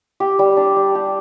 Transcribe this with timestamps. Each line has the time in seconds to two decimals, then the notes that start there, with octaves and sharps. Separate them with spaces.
0.20 G4
0.39 G3
0.57 D4
0.76 G3
0.95 G4